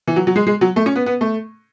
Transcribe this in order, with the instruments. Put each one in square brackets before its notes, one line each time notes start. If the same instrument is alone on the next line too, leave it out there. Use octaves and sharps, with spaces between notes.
[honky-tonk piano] E3
F#3
F#3
G#3
G#3
F#3
A3
C#4
B3
B3
A3